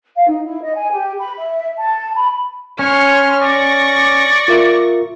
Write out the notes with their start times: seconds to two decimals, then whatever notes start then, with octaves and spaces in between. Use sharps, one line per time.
0.15 F5
0.27 D#4
0.44 E4
0.62 D#5
0.75 G#5
0.91 G4
1.19 B5
1.37 E5
1.76 A5
2.15 B5
2.79 C#4 C#5 C6 F6
3.42 D5 C#6 A#6
4.48 F4 A#4 E5